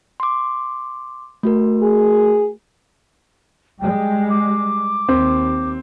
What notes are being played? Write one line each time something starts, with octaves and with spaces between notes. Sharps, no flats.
C6 D6
A3 F#4 A#4
G#4
G3 G#3 G5
D6
D#2 C4